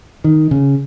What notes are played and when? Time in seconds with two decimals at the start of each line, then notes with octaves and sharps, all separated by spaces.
0.24 D#3
0.51 C#3